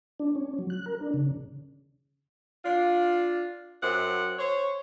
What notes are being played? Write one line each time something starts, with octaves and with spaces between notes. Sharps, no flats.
D4
C#4
F#3
F#6
A#4
D4
C#3
D4 F4
F#2 C4 F#5
C5 C#5